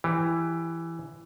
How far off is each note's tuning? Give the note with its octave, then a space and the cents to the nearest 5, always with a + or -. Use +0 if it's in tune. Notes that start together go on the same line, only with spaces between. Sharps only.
E3 +10 G4 +15